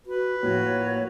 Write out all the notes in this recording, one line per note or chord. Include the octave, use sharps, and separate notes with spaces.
F#4 B4
A2 F3 A#3 F#4 C#5